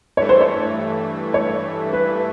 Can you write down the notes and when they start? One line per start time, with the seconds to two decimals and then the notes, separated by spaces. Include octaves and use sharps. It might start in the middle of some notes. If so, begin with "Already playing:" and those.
0.17 G2 E3 A3 C#5
0.29 C5
0.41 C#5
1.34 C#5
1.93 B4